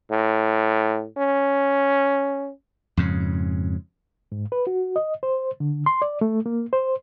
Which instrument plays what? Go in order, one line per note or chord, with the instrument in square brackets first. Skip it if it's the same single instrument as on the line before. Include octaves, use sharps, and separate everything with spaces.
[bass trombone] A2
C#4
[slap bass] F2 G#2 C#3
[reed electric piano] G#2
B4
F#4
D#5
C5
D3
C6
D5
A3
A#3
C5